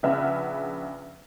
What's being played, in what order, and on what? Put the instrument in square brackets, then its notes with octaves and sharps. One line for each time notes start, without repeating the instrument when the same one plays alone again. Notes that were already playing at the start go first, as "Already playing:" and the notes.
[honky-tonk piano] A#1 C#3 B4 E5 F#5 F6